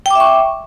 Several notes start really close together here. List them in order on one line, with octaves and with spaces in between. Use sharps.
G5 D6 E5 C#6